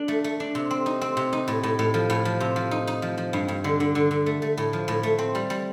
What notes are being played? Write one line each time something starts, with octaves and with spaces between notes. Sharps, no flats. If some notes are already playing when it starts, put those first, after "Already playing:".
Already playing: D4
A3
A3
D4
C3
C4
D#4
C4
C3
D#4
A2
A2
A2
F3
A2
F3
C3
F3
D#4
D#4
F3
F3
G2
G2
D3
D3
D3
D3
A3
A3
A2
F3
A2
A3
C4
G3
G3